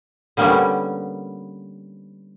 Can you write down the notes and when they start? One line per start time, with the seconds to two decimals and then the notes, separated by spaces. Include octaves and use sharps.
0.37 D3 G3 A#3 B3 C#4